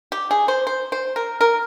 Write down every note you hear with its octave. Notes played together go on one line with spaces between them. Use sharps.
G4
G#4
C5
C5
C5
A#4
A#4